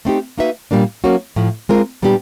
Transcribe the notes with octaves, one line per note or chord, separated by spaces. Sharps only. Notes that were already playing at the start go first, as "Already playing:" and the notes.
A3 C4 D#4 G4
A#3 D#4 F#4 B4 E5
A#2 G3 A#3 D4
F#3 A#3 C#4 F#4
A2 F3 A3
G#3 C4 F4 A#4
A#2 G3 B3 D4 G4